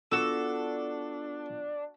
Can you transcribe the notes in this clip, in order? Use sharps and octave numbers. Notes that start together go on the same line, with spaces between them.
B3 D4 F4 F#4 A4 D6 E6